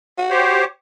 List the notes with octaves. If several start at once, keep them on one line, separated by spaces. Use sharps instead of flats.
F#4
G4 C5 C#5